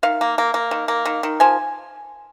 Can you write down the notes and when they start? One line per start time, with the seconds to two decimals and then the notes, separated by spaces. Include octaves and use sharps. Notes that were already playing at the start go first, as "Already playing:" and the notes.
0.03 D#3 F5
0.21 A#3
0.38 A#3
0.54 A#3
0.71 D#3
0.88 A#3
1.05 D#3
1.23 D#3
1.40 F3 G#5